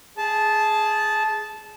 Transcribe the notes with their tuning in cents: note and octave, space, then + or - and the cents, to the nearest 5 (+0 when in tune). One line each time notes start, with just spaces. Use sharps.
G#4 +0 A5 -15